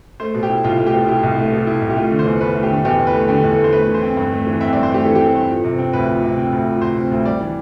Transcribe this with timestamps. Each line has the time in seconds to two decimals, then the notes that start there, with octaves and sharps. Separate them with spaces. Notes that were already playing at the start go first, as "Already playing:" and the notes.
0.20 A3 C5
0.35 B2
0.43 G4
0.50 E4
0.64 C2 F4
0.79 A3
0.87 G4
0.94 B2
1.08 E4 G4
1.23 C2
1.38 A3
1.52 B2
1.67 E4
1.82 C2
1.90 G4
1.96 A3 F4
2.11 D3
2.19 C5
2.26 E2
2.41 E2 B4
2.55 A3
2.63 G4
2.70 D3
2.85 E2 G4
3.00 E2
3.07 B4
3.14 A3
3.28 D3 G4
3.44 E2
3.51 A4
3.58 E2
3.64 C5
3.73 A3 B4
3.88 E3
3.94 C5
4.02 C4
4.17 G2
4.32 A3
4.47 E3
4.61 C4 E5
4.73 D5
4.76 G2
4.83 C5
4.90 A3 G4
5.05 E3 A4
5.15 G4
5.21 C4
5.26 A4
5.35 G2
5.50 F3
5.64 C3
5.78 C4
5.93 D2 B4
6.08 F3
6.23 C3
6.37 C4
6.52 D2
6.67 F3
6.81 C3 C5
6.97 C4
7.11 D2
7.25 G3 D5
7.41 E3